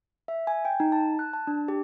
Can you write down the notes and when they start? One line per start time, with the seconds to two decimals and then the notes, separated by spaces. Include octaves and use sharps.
0.28 E5
0.47 G#5
0.65 G5
0.80 D#4
0.92 A5
1.19 F#6
1.33 A5
1.47 D4
1.68 G4